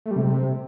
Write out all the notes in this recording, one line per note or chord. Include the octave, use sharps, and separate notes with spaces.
A3
G3
C3